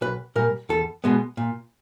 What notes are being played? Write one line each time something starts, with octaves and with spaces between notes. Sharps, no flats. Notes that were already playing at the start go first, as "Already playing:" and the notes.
B1 B4
A#2 G3 A#4
E2 A4
B2 G#3 B3
A#2